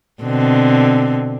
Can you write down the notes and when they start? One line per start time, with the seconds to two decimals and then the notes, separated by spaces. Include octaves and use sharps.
0.23 B2 D3 C4